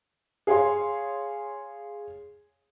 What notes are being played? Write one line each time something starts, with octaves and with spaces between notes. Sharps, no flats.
G#4 C#5 F5 C6